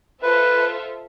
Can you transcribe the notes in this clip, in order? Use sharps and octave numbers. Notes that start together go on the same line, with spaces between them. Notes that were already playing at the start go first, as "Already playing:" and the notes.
F4 A4 B4 C5 E5